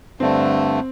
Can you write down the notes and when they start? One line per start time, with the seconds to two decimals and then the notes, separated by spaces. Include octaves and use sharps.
0.20 G2 D3 A3 C4